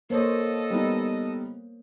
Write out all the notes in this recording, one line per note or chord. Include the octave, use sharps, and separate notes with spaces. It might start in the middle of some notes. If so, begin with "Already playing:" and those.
A#3 A4 C5 C#5 D#5
G3 B3 D#4